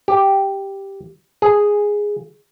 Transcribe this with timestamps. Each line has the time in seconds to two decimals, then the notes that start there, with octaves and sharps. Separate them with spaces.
0.08 G4
1.42 G#4